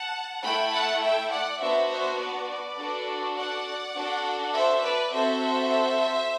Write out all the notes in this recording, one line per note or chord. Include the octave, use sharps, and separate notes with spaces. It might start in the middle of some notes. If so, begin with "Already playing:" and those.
Already playing: F#5 A5
A3 E4 A4 G5 B5
F#5 A5
E5 G5
D5 F#5
B3 D4 F#4 C5 E5
C5 E5
B4 D5
D4 F#4 A4
D5 F#5
D4 F#4 A4
C5 E5
B4 D5
C4 F#4 A4 C5 E5